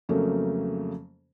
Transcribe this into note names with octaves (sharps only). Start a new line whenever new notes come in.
F2 C#3 F#3 A3 A#3